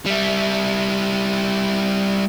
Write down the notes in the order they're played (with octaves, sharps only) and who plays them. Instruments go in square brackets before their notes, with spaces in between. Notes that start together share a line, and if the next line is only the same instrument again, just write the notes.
[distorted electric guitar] G3 E4